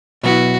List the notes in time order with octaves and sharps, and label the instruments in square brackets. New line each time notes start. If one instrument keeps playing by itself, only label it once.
[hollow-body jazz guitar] B2 F#3 B3 E4 [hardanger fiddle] F#4